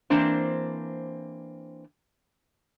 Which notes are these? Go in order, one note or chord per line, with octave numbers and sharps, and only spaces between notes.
E3 A#3 C4 D4 C5